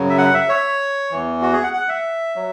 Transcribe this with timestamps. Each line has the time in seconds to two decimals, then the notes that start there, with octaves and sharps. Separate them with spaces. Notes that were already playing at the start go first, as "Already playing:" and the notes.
Already playing: F#2 C#3 F#3
0.10 E5
0.18 F#5
0.34 E5
0.49 C#5
1.11 E2 E3
1.42 F#4
1.53 G#4
1.63 F#5
1.73 F#5
1.89 E5
2.36 F#3